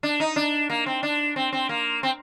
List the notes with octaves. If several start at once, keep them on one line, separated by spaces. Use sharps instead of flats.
D4
D#4
D4
A#3
C4
D4
C4
C4
A#3
C4